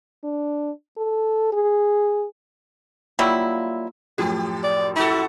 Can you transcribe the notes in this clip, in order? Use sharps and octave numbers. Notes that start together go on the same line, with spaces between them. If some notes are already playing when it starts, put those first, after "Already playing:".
D4
A4
G#4
F#3 G3 A#3 E4 F4
F#2 A2 F3 G4
D5
E4 F#4 A4